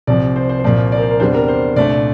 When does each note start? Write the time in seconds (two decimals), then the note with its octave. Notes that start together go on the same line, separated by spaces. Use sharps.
0.07 C2 C3 F3 D5
0.36 C5
0.49 C5
0.59 C5
0.64 C2 A#2 F3 A#3 D5
0.92 D5
0.97 A#4
1.02 C5
1.11 A#4
1.20 E2 C3 G3 D4 C5
1.34 A#4
1.48 C5
1.76 C2 A#2 A3 D4 D5